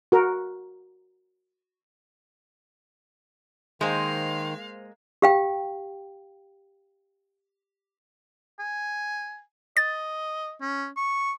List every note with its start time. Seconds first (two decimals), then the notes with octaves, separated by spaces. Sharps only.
0.12 F#4 A#4
3.81 D#3 G#3 A#3 C5 F5
5.22 G4 F5 G5
8.60 G#5
9.77 D#5 A6
10.62 C#4
10.97 C#6